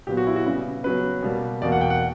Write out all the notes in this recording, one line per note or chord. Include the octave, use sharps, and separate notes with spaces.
A#2 F#3 B3 G4
F#4
E4
F#4
C#3 G3 B3
C#3 F#3 B3 B4
B2 G3 A#3
E2 B2 A#3 D5
F#5
G5
F#5